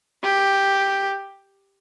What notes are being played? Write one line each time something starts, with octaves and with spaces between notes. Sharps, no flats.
G4